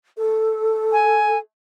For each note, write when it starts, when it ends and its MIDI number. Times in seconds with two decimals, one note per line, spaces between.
0.17 1.35 69
0.92 1.38 80